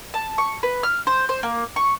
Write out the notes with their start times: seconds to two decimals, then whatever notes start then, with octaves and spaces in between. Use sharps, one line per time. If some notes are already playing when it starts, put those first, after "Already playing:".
0.14 A5
0.38 C#6
0.63 B4
0.83 F6
1.07 C5
1.29 C5
1.43 A#3
1.76 C#6